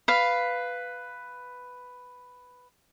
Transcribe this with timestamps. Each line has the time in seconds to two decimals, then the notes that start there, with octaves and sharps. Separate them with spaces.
0.08 B4 F5